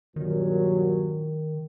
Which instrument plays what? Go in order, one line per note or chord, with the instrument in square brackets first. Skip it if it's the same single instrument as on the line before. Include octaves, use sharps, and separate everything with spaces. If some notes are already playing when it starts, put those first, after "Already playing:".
[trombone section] G2 A#2 F#3 [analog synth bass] D#3